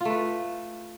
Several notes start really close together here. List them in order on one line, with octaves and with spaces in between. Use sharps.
F4 A3 B4